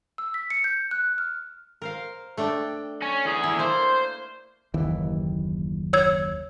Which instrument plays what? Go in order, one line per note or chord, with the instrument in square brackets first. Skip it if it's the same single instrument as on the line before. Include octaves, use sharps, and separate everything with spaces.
[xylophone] E6
B6
C#7
G6
F#6
F6
[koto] A#4 C5 F5
A3 D4 G5
[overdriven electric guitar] C#4
E2 G#4
[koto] E4
[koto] A3 A#3 [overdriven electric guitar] C5
[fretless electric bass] F#1 D#2 E3
[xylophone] C#5 E6 G#6